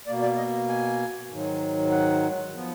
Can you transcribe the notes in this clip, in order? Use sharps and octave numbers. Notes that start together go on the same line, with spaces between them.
B2 A#3 D5
D5
D#5
G#5
G#2 D#3 F#3
F#5
F3 B3